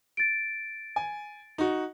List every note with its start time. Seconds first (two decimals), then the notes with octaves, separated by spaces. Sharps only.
0.17 A6 D7
0.96 G#5
1.58 D#4 F#4